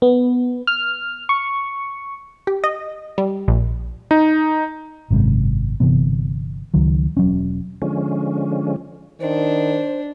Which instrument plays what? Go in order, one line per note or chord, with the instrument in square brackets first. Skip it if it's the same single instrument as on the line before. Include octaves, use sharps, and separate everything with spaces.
[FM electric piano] B3
F6
C#6
[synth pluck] G4
D#5
G3
A#1
[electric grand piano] D#4
[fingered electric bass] G#1 F#2 C3 G#3
G1 C3 E3 B3
C#2 D#3 F#3
E1 F#3 C#4
[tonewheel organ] D3 F3 G#3 C#4
[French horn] D#3 [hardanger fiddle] D4 [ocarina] C5